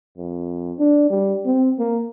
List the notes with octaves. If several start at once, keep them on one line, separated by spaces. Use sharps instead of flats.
F2
D4
G3
C4
A#3